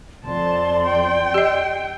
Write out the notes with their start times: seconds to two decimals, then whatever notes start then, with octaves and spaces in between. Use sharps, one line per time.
0.25 F2 D5 A5 C6
0.85 G5
1.34 G4 D#5